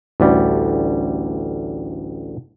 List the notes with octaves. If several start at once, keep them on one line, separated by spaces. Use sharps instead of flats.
A1 D2 G3